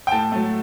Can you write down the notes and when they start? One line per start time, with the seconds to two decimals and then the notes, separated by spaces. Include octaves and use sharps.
0.07 G5
0.12 A2 A5
0.32 F#3 A3